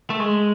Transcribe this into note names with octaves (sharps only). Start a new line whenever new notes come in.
A3
G#3